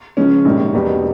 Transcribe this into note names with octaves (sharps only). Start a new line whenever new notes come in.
C#2 C#3 F3 G#3 C#4
A#1 G#2 D#3 G3 A#3
E1 E2 B2 G3 A#3